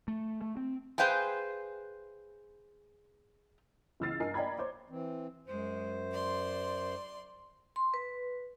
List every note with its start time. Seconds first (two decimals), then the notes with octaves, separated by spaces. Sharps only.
0.08 A3
0.42 A3
0.57 C4
0.98 G#4 B4 C5 F5 G5 G#5
4.00 C#2 E3 E6 F6 A6 C7
4.20 G2 A#4 D#5 G#5 C7
4.34 D5 D#5 G5 A#5 B5 G#6
4.58 C5 C#5 D6
4.90 E3 C4
5.48 F#2 G#3 C5
6.13 D5 C6
7.76 C6
7.94 B4